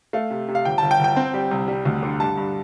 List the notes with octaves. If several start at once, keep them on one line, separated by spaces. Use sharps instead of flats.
A3 F5
C3
C3
F5
G1 G5
A5
G1
G5
G1
G5
C4
G3
C2
G3
D2
D3
G2 A5
G2